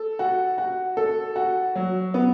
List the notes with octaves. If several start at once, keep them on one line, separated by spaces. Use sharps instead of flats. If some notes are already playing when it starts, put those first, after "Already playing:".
Already playing: A4
F#4
F#4
A4
F#4
F#3
B3